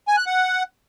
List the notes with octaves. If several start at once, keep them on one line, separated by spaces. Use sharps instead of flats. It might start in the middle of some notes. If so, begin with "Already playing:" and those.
G#5
F#6
F#5